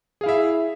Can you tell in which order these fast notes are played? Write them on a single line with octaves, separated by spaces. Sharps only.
G#4 F5 E4 E5